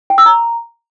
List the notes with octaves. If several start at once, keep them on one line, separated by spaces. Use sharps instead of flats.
G5
E6
A#5